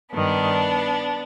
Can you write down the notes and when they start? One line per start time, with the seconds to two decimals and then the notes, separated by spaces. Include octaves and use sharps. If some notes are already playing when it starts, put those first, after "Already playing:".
0.14 G2 D#3 B3 D4